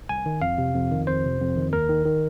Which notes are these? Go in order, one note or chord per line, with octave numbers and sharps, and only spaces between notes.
C2 G#5
D#3
F2 F5
C3
F2
D#3
F2 C5
C3
F2
D#3
D#2 A#4
D#3
D#3